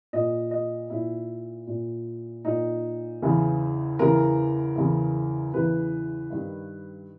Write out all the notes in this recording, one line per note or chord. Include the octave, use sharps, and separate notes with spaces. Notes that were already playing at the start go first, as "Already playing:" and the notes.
A#2 D#5
D#5
A#2 E4
A#2
A#2 D#4
E2 C#3 E3
E2 C#3 E3 A#4
E2 C#3 E3
E2 C#3 E3 B4
G2 D#3